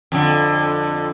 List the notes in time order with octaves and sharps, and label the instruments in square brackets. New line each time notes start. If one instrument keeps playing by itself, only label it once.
[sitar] F2 D3